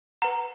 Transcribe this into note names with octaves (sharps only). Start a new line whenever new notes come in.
B4 F#5 A#5